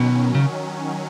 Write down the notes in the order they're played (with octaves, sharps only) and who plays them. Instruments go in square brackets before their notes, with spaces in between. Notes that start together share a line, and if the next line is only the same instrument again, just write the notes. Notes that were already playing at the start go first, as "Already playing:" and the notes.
Already playing: [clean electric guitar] B2 [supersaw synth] D#3 F#3 C#4
[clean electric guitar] C#3